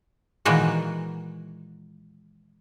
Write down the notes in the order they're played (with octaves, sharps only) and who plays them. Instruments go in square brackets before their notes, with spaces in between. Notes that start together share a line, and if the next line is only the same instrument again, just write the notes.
[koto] A#2 D#3 E3 G#3 F#4